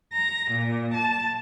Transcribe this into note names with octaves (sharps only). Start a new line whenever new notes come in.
A#5
A#2
A5